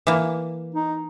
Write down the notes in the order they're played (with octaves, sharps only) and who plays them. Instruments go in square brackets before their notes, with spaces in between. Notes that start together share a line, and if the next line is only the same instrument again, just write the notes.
[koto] E3 A#3
[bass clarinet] D#4